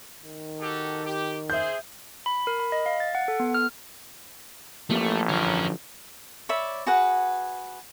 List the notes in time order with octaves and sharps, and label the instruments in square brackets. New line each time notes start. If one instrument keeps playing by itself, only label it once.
[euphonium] D#3
[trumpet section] F#4 G4 A4
G4
[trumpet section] G#4 C5 [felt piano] E5 G6
[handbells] B5
A#4
B5
D#5
F5
A6
F#5
A4
B3
F6
[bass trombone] A1 [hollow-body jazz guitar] F3 A#3 G4 [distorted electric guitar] A3
[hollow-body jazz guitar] D3 E3 F3 [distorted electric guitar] C#4 A#4
[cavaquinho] C#5 D5 E5 B5
F#4 G#4 B4 F#5